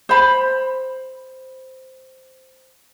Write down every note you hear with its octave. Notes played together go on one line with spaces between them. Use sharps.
C5 B5